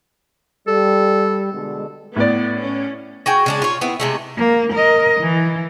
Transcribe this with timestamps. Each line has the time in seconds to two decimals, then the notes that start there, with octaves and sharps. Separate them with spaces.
0.68 G3 A4
1.53 B2 D3 G#3
2.16 A2 B3 D5
2.59 C#4
3.26 F#4 G#4 G5
3.46 C#3 G#3 D4
3.62 F4 C#5
3.81 B3 C4 E4
4.00 C3 G#3 A3
4.37 A#3
4.73 A#4 D#5
5.20 E3